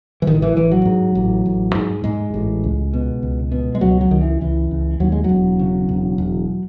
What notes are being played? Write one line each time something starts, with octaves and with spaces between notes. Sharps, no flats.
E3
A1 D#3
E3
A1 E3
F#3
G#2
A1
A1
G#2
G#2 G#3
A1
C#2
B2
C#2
B2
G#3
C#2 F#3
F#3
C#2 D#3
E3
C#2 E3
C#2
D#2 F#3
G#3
E1 F#3
C#3
E1
E1